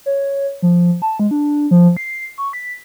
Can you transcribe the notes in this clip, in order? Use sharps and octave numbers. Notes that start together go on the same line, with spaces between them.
C#5
F3
A5
G#3
D4
F3
C7
C#6
B6